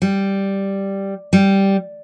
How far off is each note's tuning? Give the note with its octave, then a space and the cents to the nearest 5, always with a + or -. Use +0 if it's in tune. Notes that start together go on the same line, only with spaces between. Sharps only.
G3 +0
G3 -5